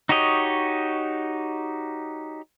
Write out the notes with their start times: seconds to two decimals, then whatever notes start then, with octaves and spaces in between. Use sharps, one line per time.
0.09 D#4 F#4 G4 C#5 D#5